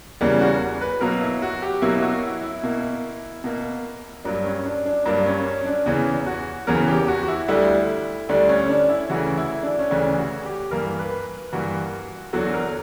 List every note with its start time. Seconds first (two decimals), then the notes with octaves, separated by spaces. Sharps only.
0.21 E2 C#3 G3 A#3
0.41 F#4
0.81 B4
1.01 B2 F#3 A#3 A#4
1.22 E4
1.42 F#4
1.62 G4
1.82 B2 F#3 A#3 E4
2.02 F#4
2.23 E4
2.43 E4
2.63 B2 A#3
3.44 B2 A#3
4.24 G2 F#3 A#3 D4
4.45 C#4
4.65 D4
4.85 D4
5.05 G2 F#3 A#3 D4
5.26 C#4
5.46 C#4
5.66 D4
5.86 E2 C#3 E3
6.26 F#4
6.67 E2 C#3 E3 A#4
6.88 G4
7.08 F#4
7.23 F#4
7.28 E4
7.48 D2 D3 G3 E4
8.29 D2 D3 G3 D4
8.49 C#4
8.69 D4
8.89 E4
9.10 D2 C#3 E3 F#4
9.37 E4
9.63 D4
9.79 C#4
9.90 D2 C#3 E3 D4
10.18 F#4
10.45 G4
10.71 G2 E3 A#3 A#4
10.99 B4
11.53 G2 E3 A#3 F#4
12.33 E2 D3 F#3 F#4
12.53 A#4